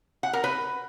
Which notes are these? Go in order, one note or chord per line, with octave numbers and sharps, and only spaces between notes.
F#5
A#4
B4